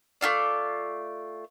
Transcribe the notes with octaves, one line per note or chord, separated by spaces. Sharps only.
A3 D#4 F4 D5